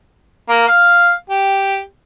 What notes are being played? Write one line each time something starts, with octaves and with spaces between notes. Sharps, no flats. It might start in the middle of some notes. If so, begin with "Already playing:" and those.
A#3
F5
G4